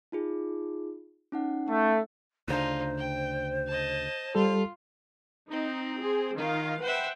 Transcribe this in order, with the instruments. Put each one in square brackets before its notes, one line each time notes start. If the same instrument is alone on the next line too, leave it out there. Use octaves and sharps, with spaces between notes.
[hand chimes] D#4 F4 G#4
C#4 D#4 F#5
[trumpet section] A3
[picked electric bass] D2 C#3 D4 [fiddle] D#4 F4 [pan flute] C5
[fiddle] G5
D#5 A5
[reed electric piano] G3 A4 [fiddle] F4
[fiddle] C4 [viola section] D#4
[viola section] G#4 C5
[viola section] D#3 F5 [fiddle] F4
[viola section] B4 F#5 G5 [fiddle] C5 E5